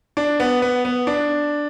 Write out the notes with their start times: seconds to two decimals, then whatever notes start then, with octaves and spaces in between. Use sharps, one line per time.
0.17 D4
0.40 B3
0.62 B3
0.85 B3
1.07 D4